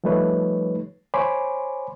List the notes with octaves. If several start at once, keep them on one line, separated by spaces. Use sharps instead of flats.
F3 G3 A3 D#4 B4 C#5
C5 C#5 G#5 B5 C6 D6